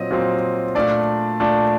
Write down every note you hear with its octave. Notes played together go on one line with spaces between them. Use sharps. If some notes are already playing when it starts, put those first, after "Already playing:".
Already playing: A#2 F#3 C4 D#5
A#2 F#3 C4
A#2 A3 D4 D5
A#2 A3 D4